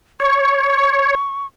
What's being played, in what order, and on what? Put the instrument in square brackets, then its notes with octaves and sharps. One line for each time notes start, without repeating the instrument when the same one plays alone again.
[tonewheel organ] C#5 [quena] C#6